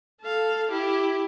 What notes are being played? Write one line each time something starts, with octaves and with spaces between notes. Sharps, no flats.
A4 F5
E4 G4